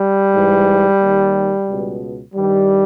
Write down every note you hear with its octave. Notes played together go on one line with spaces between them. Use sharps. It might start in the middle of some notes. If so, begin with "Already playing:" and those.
Already playing: G3
G#2 E3
D#2 D#3
C#2 B2
G2 D#3 G3